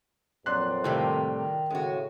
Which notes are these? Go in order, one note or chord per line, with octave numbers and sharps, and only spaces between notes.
F2 A#2 F#3 D5 C6 F#6
A2 C3 D#3 G3
D#3
A2 C#3 G#3 F#4